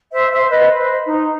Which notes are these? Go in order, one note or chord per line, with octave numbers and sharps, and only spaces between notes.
C5 E5
C5 E5
E5
B4 D#5
C5
D#4